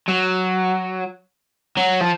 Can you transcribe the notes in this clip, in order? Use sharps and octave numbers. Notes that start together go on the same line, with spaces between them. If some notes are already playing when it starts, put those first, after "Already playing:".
F#3
F#3
F3